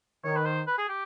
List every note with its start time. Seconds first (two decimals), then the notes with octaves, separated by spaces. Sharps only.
0.23 D#3 C#5
0.36 B4
0.46 C5
0.67 B4
0.78 G#4
0.89 G4